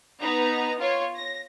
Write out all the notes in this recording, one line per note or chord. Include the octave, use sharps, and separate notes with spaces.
B3 D#4 A#5
F4 C#5
A#6